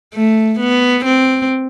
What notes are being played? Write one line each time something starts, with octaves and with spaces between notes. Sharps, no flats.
A3
B3
C4